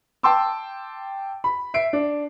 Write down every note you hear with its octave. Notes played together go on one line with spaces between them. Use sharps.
G5 A5 C6 D6 E6
B5
E5 C7 D7
D4